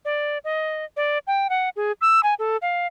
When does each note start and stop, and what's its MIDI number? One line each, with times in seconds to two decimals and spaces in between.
0.05 0.38 74
0.44 0.85 75
0.97 1.18 74
1.27 1.47 79
1.50 1.69 78
1.76 1.92 68
2.01 2.20 88
2.23 2.34 80
2.39 2.57 69
2.62 2.87 77